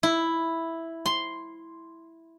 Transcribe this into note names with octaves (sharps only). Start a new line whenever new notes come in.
E4
C6